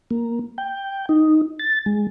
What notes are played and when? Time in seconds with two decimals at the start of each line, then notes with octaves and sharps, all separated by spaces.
0.11 A#3
0.58 G5
1.09 D#4
1.59 A6
1.86 G#3